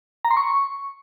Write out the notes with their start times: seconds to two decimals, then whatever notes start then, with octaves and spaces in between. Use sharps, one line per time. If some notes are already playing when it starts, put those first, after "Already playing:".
0.25 A#5
0.31 C6
0.37 C#6